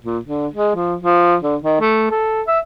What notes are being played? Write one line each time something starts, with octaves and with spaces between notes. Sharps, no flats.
A#2
D3
G#3
F3
F3
D3
D#3
A3
A4
E5